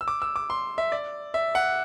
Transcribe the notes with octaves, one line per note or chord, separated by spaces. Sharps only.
E6
D6
E6
D6
C6
E5
D5
E5
F#5